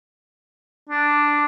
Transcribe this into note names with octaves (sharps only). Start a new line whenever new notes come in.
D4